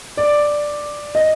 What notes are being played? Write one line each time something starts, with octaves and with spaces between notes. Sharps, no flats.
D5
D#5